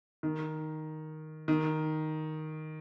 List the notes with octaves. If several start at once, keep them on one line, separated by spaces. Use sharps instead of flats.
D#3
D#3